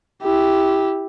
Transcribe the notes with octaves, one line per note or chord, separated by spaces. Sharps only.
E4 G4